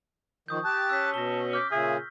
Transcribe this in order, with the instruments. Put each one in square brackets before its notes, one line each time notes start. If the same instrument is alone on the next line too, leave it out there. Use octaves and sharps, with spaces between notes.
[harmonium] D#3 F3 [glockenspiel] C#6 D#6 G6
[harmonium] G4 A5 [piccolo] F#6
[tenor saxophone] C#4 [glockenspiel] E6 B6
[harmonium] B2 [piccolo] A5 [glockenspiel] A#6 G7
[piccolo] D6 [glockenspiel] F6 G6 B6
[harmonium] A#2 C#3 [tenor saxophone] G#4 [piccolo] E5